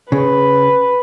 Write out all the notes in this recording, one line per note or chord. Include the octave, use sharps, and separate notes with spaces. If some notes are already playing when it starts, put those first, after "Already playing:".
C#3 B4